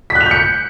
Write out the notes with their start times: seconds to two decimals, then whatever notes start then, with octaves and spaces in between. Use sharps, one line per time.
0.10 B6
0.15 F#6
0.21 F7
0.26 G6
0.31 C#7